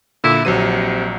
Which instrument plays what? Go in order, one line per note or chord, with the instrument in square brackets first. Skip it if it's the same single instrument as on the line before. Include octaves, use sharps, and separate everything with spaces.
[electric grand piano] A#2 D3 [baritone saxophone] E4
[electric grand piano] A#1 F#3 D#7 [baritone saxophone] C3